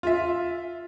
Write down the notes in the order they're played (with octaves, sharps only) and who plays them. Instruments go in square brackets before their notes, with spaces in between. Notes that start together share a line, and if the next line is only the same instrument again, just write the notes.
[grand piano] F4 E5